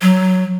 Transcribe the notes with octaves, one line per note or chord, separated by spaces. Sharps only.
F#3